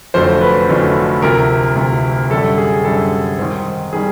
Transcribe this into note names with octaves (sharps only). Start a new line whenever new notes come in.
F1 F2 D3 F#3 A3 C5
B4
F1 F2 D3 F#3 A3
D2 C3 F3 A#4
D2 C3 F3
F#2 D3 G3 A4
G#4
F#2 D3 G3 A4
G#2 D#3 G3 C4
D#3 G3 C4 G#4